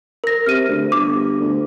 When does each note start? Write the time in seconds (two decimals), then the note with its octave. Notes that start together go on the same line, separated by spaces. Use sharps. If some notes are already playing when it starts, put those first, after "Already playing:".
0.24 A#4 A#6
0.46 C3 F6 D#7
0.69 D2
0.92 G1 D6
1.40 D2